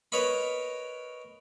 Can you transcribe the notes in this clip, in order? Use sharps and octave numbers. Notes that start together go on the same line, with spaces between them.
A#4 B4 C#5 D#5 F5 B5